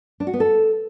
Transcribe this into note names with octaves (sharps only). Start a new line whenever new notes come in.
D4
F#4
B3
A4